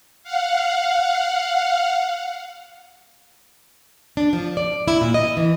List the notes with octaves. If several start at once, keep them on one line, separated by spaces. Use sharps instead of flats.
F5 F#5
D4
F3
D5
E4
A#2
D#5
E3